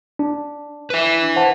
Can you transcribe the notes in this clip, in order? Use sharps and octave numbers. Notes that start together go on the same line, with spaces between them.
D4
B4 E5
C5 F#5 A5